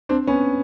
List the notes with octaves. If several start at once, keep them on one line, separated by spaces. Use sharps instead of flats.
C4 D4
B3 C#4